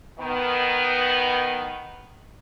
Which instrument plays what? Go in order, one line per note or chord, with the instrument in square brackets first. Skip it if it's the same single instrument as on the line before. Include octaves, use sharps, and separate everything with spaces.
[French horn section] D#3 B3